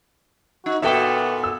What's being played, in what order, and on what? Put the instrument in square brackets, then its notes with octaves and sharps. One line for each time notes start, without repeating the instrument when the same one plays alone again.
[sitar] D#4 [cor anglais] F#4
[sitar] A#2 F#4 A4 [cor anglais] B3 [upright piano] E5 G5
[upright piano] E6